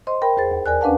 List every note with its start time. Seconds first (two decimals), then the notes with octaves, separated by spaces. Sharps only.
0.07 C5 D#5 C6
0.21 A#4 G5 B5
0.37 E2 G#4 C5 A6
0.51 D#2
0.66 A#4 D5 G#5 F#6
0.81 C#4 D4 B4 F5 F#5 A5